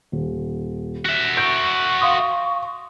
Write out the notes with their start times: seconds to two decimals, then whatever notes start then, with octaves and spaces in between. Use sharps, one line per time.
0.12 D#1
1.06 F#4 E5
1.37 C#6 G6 D7
2.01 F5 C6 D#6